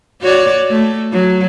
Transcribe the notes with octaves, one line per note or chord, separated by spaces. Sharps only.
F#4 C#5 D5
A3
F#3